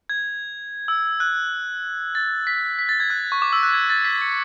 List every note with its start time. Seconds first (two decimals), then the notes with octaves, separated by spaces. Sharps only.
0.09 G#6
0.88 E6
1.20 F#6
2.15 A6
2.47 B6
2.79 B6
2.89 A6
3.00 G#6
3.10 F#6
3.32 C#6
3.42 D6
3.53 E6
3.63 F#6
3.73 G#6
3.90 A6
4.05 B6
4.22 C#7